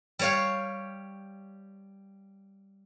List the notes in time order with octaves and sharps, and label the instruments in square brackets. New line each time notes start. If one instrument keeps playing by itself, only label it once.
[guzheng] G3 C#5 F5